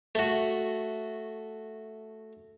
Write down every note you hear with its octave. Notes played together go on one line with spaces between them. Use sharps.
A3 F#4